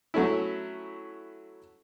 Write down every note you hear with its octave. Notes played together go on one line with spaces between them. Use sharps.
F#3 A3 C#4 E4